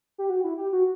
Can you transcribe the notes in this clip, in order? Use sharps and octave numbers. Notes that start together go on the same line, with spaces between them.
G4
F#4
E4
G4
F#4